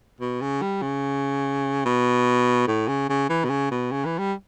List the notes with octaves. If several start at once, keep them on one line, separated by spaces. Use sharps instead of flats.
B2
C#3
G3
C#3
B2
A2
C#3
C#3
E3
B2
C#3
B2
C#3
E3
G3